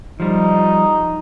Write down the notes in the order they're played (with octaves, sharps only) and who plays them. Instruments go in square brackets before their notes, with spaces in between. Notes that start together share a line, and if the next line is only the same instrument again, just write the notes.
[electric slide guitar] F3 G3 [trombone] D#4